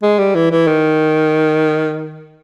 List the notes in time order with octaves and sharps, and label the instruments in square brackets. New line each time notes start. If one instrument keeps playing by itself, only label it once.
[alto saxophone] G#3
G3
E3
E3
D#3